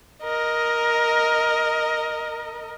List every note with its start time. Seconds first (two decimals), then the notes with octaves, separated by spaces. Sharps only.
0.24 A#4 D#5